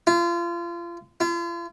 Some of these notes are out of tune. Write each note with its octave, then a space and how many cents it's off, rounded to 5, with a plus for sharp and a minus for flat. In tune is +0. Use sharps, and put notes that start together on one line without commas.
F4 -30
F4 -40